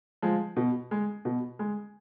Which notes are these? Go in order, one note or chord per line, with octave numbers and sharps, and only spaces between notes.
F3 G#3
B2
G#3
B2
G#3